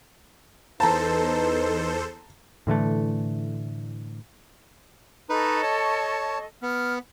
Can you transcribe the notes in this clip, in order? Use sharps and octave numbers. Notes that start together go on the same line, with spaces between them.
E2 D#4 A4 B4 C5 A5 A#5
A2 D3 E3 A3
D#4 A4 B4 D#5 C#6
C#5 A5
B3 F6